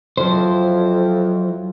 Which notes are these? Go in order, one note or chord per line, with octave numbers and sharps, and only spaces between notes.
F2 F#3 E4 C5